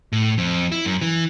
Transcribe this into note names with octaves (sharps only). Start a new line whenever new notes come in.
A2
F2
E4
F#2
E3